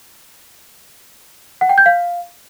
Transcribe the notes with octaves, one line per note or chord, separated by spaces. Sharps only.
F#5
G5
G6
F5